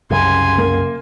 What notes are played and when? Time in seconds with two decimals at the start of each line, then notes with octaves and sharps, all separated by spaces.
0.11 C2 F#2 C#3 G#5 C6
0.58 A#3